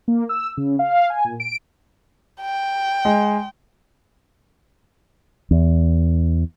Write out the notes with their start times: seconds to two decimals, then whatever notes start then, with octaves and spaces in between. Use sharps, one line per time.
0.08 A#3
0.29 E6
0.57 C#3
0.79 F5
1.10 G#5
1.25 A#2
1.40 D7
2.41 G5
3.05 G#3
5.51 E2